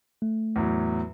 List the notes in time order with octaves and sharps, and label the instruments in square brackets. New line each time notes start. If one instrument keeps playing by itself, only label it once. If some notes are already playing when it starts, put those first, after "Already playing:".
[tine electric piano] A3
[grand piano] E2 A2 F#3